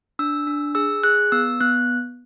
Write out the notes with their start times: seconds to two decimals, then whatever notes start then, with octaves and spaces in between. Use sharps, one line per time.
0.19 D4 E6
0.47 D4
0.75 G#4 E6
1.04 G#4 F#6
1.32 B3 E6
1.61 B3 F#6